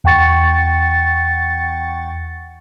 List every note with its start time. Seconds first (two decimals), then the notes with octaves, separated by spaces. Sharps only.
0.04 E2 F#5 G5 C#6 A6 C#7